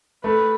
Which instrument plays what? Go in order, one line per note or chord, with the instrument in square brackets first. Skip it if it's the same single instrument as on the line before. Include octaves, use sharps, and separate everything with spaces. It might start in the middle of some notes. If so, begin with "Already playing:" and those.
[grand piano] A3 [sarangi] B4